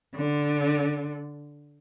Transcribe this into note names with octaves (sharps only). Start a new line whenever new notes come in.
D3